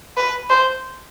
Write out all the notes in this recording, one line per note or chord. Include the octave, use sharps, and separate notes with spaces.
B4
C5